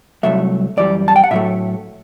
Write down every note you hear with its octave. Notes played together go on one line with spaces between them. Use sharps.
C2 C3 F#3 A3 E5
F#2 E3 G3 D5
A5
G5
F#5
A2 F#3 A3 E5